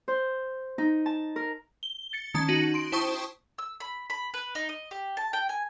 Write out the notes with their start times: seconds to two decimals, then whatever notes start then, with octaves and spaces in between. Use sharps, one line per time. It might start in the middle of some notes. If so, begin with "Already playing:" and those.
0.08 C5
0.78 D#4
1.06 A5
1.36 A#4
1.83 G7
2.13 A6 C#7
2.34 D#3 C#4 A5
2.48 D#4 F#4
2.74 C6 D7
2.92 E4 C5 G5 A5 C#6 D#6
3.58 E6
3.80 B5
4.10 B5
4.34 B4
4.55 D#4
4.69 D#5
4.91 G4
5.17 A5
5.33 G5
5.49 G#5